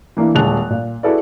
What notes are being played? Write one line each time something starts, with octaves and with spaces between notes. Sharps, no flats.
E3 A#3 D4 E4
D#1 G#3 A5 F#6 F7
A#2
E4 F#4 G#4 A4 B4 D5